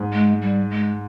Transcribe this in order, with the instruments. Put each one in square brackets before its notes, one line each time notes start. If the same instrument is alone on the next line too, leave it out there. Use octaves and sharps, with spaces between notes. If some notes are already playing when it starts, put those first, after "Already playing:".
Already playing: [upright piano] G#2
[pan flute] G#3
G3
G#3